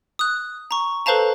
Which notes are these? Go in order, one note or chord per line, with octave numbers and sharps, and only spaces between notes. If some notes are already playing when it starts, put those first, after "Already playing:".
D#6 F#6
A#5 C#6
A4 B4 C5 F5 A5 A#5